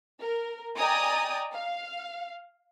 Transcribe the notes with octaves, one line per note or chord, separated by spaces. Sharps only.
A#4
D5 D#5 G5 G#5 A#5 D#6
F5